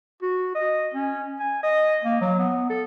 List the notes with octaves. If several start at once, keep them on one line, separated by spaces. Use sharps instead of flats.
F#4
D#5
C#4
G#5
D#5
A#3
F#3
B3
A4